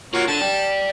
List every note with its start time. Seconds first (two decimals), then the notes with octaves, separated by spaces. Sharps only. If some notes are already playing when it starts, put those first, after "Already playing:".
0.14 A#3 F4 F#4 C#5
0.28 D3 A5
0.41 D5 G5